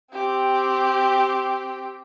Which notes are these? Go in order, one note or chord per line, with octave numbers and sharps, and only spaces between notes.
C4 G4